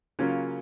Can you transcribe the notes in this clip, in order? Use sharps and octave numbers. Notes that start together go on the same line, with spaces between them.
C#3 F#3 A#3 C#4 F4